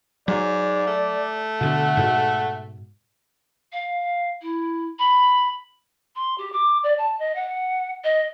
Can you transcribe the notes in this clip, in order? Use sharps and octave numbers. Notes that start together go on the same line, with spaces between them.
G#2 F#3 D5
A3
B2 D3 F#5
G#2 B2
F5
E4
B5
C6
G4
D6
D5
A5
D#5
F#5
D#5